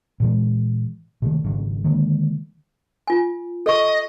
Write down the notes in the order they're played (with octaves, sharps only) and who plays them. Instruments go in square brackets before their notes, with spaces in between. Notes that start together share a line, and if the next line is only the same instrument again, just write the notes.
[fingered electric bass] A#2 E3 G#3
C3 D#3 A3
G#1 C#3 F#3
D3 D#3 G#3 A#3
[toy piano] F4 G#5
[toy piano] A4 C#6 [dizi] D#5